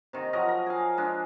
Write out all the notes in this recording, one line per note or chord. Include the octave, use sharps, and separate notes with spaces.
C3 D#3
F3 F#3 A#4 D#5
A#4
G#4 F5
G#3 D4